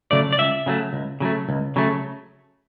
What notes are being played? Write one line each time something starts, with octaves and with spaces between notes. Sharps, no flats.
C#3 F#3 A3 D5
D5
C#2 E5
C#3 F#3 A3
C#2
C#3 F#3 A3
C#2
C#3 F#3 A3